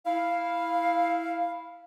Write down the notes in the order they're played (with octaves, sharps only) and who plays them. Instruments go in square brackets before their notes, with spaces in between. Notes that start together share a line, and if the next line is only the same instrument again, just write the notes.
[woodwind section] E4 F5